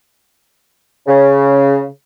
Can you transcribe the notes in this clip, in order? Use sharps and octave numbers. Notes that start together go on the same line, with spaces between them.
C#3